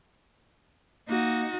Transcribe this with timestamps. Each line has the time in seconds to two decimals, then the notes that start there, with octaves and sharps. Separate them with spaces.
1.09 A#3 D#4 F#4